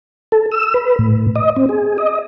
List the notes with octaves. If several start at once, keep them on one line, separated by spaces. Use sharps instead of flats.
A4
E6
B4
A2
D#5
C4
G#4
D#5